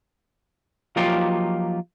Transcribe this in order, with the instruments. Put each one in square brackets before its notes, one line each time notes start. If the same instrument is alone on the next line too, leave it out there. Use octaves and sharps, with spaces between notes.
[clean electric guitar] F3 F#3 A#3 D#4 F4 G4